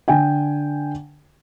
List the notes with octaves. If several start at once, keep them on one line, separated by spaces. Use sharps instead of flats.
D3 G5 G#5